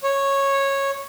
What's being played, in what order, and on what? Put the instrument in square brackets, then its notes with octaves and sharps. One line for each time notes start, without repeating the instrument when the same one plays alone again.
[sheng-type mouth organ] C#5